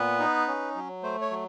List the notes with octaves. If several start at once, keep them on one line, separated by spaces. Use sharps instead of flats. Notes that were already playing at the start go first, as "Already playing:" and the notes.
Already playing: A#2 B3 B4
D#4
C#4
F#3
A3 C5
C#5
F#3